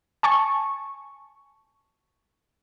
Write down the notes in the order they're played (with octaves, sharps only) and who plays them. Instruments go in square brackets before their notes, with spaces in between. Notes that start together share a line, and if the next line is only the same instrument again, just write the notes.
[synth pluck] G#5 A5 C#6